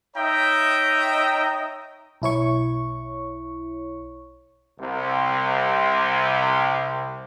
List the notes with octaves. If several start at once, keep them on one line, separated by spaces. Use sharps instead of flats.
D#4 C#5 E5 G5 A#5 D#6
B1 E4 C#5 C#6
C2 C3